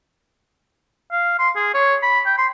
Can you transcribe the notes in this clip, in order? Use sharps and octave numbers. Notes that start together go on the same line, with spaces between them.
F5
C6
G#4
C#5
B5
G5
C6